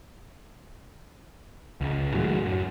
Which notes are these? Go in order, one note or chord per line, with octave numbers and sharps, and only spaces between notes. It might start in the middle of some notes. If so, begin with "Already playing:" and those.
C#2
A2 D#3 F#3 G#3
F#2